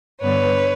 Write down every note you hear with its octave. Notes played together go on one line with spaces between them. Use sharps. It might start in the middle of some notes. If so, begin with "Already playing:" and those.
G2 D3 G3 B3 B4 C#5